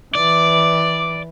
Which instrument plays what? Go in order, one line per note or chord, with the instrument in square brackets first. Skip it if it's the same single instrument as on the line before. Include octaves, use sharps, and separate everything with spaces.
[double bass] E3 [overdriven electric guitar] D5 [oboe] D6